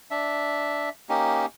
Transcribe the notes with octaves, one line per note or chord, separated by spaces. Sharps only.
D4 E5
A#3 C#4 D#4 G4